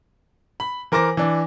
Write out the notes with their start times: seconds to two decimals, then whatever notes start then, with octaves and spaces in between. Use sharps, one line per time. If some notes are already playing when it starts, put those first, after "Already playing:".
0.60 B5
0.92 E3 A#4 C5 D6 A#6
1.17 E3 D4